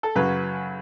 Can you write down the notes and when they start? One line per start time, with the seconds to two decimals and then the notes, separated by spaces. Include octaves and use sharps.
0.03 A4
0.15 F#2 C#3 F#3 B4